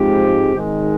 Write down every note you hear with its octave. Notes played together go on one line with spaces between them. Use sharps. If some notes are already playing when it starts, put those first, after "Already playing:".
Already playing: G#2 F3 G#3 C4 G4
G#1 G#2 D#3 G#3